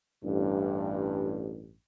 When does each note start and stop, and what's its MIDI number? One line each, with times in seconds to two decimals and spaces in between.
0.23 1.73 33
0.23 1.73 43